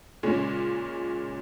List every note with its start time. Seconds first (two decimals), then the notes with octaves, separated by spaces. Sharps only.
0.23 A#2 C#3 G#3 C#4